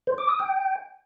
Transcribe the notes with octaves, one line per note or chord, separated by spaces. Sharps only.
C5
D6
D#6
G5